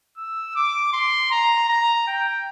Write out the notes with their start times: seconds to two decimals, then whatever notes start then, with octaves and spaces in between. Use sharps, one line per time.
0.18 E6
0.56 D6
0.93 C6
1.31 A#5
1.69 A#5
2.07 G5